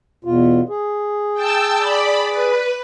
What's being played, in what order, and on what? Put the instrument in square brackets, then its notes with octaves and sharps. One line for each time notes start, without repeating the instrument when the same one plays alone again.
[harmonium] E2 B2 F4
G#4
[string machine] G5 A5 E6
D5 B5
B4